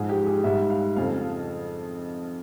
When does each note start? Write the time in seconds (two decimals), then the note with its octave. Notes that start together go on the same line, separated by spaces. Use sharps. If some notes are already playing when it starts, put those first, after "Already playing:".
Already playing: G#2 F3 G#4
0.09 G4
0.26 G#4
0.44 G#2 G3 E5
0.70 F5
0.96 F2 C#3 F3 F5